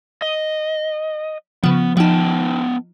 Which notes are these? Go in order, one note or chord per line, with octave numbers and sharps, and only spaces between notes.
D#5
C#3 F3 B3
F3 B3 D#4 G5 A5